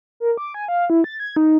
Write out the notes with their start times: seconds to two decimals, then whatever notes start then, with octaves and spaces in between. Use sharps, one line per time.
0.20 A#4
0.37 D6
0.54 G#5
0.68 F5
0.90 E4
1.04 A6
1.20 G#6
1.36 D#4